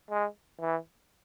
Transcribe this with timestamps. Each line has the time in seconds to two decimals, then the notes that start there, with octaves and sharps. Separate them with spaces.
0.10 G#3
0.61 E3